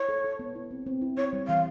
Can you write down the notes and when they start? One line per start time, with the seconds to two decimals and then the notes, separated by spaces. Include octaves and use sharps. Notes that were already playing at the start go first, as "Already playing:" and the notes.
Already playing: E4 C#5
0.09 A4
0.24 A4
0.39 B3
0.55 E4
0.71 C4
0.86 C4
1.02 E4
1.17 E4 C#5
1.33 G3
1.47 E3 F5